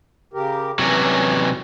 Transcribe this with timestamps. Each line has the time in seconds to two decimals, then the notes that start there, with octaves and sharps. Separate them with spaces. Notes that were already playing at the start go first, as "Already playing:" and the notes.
0.34 C#3 G4 A#4
0.79 C3 E3 F#3 C#4